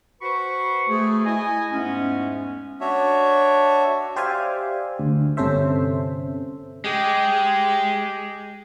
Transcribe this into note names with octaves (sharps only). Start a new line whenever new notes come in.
F#4 B4 C5 B5 C#6
A3 G#4
E4 D#5 G#5
E2 G#2 G#3 A3 B3 C#4
D4 F#4 C#5 E5
G4 C5 D5 E5 F5 G#5
D2
G1 C3 C#4 A4 C5 E5
G#3 G4 G#4